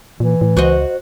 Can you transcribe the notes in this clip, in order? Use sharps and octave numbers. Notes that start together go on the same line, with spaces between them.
A#2 E3
A2
C#2 F#4 C5 D#5